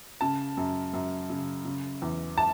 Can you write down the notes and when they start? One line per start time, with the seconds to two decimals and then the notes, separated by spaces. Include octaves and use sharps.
0.21 C#3 A5
0.57 F#2
0.93 F#2
1.30 C#3
1.65 C#3
2.02 E2
2.38 A5